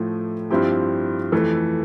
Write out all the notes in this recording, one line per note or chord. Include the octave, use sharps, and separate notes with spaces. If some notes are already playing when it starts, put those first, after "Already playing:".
Already playing: A2 F3 A3
G2 F3 C4 E4 G4
F2 E3 A3